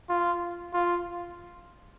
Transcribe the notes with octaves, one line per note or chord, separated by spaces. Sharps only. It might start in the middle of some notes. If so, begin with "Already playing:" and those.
F4
F4